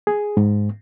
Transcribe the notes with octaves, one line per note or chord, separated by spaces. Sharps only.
G#4
G#2